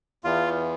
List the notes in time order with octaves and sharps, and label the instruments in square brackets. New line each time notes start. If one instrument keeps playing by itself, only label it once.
[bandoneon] E2 F4